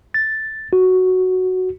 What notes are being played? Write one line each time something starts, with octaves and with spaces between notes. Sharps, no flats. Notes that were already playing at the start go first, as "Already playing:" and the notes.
A6
F#4